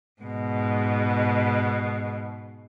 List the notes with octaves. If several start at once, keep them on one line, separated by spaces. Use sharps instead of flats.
G#2 B2